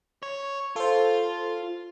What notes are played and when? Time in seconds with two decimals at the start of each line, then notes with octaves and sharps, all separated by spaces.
0.23 C#5
0.76 F4 A4 C5